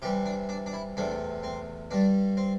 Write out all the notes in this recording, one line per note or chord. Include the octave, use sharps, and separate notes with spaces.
C3 E3 G3 G4
D4
D4
D4
E4
E2 C3 A3 D4
C4
G2 G3 D4
C4